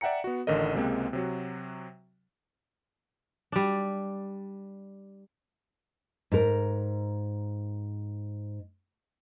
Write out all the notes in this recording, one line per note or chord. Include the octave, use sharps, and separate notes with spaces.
D5 E5 F#5 G5 A#5 C#7
B3 F#4
A1 D3 D#3 A#4 D#5
C#2 C3 G#3 A#3 C4
C3 F#3 F#4
G3 D4
G#2 A#4